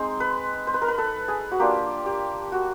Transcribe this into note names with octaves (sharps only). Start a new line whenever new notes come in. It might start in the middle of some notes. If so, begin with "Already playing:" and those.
Already playing: G#3 C4 D#4 C5
B4
C5
B4
A#4
B4
A4
G#4
F#4
A#3 D4 F4 G4
G4
F#4